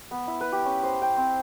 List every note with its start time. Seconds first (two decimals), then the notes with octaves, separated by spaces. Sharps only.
0.11 B3
0.28 E4
0.41 B4
0.52 G4
0.65 C#4
0.83 C5
1.02 G5
1.16 C4